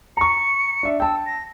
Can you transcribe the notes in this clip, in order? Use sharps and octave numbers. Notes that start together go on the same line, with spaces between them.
A#5 C#6 C#7
D4 E5
G5 A5 E6
A#6